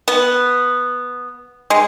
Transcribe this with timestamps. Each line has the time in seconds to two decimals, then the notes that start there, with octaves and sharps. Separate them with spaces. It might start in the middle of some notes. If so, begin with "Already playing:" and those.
0.08 B3
1.70 G#3